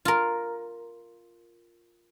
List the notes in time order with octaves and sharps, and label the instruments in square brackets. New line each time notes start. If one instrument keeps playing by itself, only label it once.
[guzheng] F4 A#4